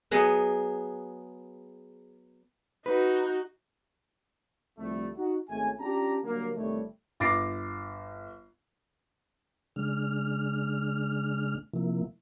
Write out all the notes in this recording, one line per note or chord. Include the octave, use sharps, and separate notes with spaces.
F#3 B3 G#4 D#5
D#4 F#4 B4
C2 D3 F3 G3 A3
D#4 F#4
G#1 G#3 A3 C#4 G#5
C#4 D4 F4 G4 A5 A#5
D3 F#3 G3 A#3
G1 C3 D#3 G3 A3 C#5
G1 D6 A6 A#6 C7 D7
C#3 G#3 D4 F6
C3 F3 A#3 E4